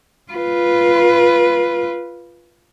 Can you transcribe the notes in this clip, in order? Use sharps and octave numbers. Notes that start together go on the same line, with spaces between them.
F4 B4